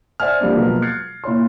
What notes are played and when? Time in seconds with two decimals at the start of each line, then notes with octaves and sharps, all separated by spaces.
0.20 C5 D5 E5 F#5 G#5 F6
0.40 F3 G3 A#3 C4 D4
0.56 B2 F3 F#3 G#3 A#3 B3
0.82 F6 F#6 G#6 A6 C7 C#7
1.24 A#2 E4 C#5 C6